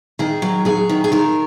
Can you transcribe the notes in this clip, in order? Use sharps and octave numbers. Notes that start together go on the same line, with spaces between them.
D#3 G#4
F#3
F#3 G#4
D#3
G#4
D#3 A#4